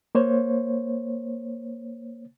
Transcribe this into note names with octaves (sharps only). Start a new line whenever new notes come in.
A#3 C5 C#5